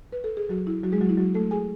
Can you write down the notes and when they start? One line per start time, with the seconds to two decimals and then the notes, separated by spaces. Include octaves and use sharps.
0.12 B4
0.24 A4
0.37 G#4
0.49 F#3 F#4
0.67 E4
0.84 F#3 F#4
0.92 G#3 G#4
1.01 F#3 F#4
1.09 E4
1.18 F#3 F#4
1.35 A3 A4
1.51 G#4 G#5